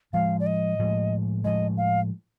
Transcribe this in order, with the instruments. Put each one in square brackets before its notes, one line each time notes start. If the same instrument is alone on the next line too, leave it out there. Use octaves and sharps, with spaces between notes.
[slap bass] A2 F3 G#3 [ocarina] F5
[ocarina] D5
D#5
[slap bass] A2 F3 G#3
[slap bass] A2 F3 G#3 [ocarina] D#5
[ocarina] F5